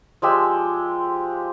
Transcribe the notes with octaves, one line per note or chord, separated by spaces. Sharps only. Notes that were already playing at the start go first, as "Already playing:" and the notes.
F3 G#3 G4 E6